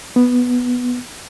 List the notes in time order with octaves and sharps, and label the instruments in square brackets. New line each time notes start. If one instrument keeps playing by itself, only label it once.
[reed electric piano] B3